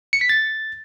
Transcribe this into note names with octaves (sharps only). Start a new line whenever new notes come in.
C#7
B6
A6